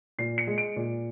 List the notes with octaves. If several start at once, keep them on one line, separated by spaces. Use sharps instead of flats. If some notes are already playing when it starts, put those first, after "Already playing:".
A#2 C7
C#7
G#3
D7
A#2